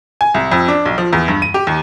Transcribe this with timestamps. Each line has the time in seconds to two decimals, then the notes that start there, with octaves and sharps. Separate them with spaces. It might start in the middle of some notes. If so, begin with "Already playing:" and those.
0.21 G#5
0.34 C2
0.52 F2
0.68 D4
0.86 B1
0.98 F3
1.13 E2
1.28 G2
1.42 D#7
1.54 G4
1.67 D#2